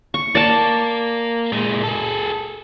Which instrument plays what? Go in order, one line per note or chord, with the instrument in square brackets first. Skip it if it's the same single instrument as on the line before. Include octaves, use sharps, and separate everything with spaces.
[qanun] C#6
[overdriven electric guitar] A#3 [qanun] D5 A5
[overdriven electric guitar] A#2 G#3
G#4 A4